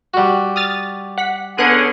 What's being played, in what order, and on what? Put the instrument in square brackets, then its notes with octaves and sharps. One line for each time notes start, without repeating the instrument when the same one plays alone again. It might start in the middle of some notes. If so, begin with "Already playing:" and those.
[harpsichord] G3 F#4
[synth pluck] D#6 F6 A6
F#5 B6
[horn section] D3 C#4 G#4 [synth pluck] B3 F#6 D#7